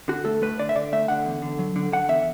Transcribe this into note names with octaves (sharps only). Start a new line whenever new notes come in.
D3 F#4
A3 A4
A3 B4
D3 D5
E5
D3 D5
A3 E5
D3 F#5
E2
D3
F#3
D3
D3 F#5
E2 E5